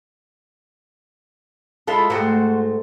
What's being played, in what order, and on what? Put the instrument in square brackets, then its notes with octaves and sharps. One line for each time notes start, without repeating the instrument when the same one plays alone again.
[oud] G#3 [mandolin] E4 F4 A4
[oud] G#2 A3 G4 [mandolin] F#4 C5